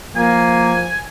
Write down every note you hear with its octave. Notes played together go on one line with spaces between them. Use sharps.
F3 A#3 G#5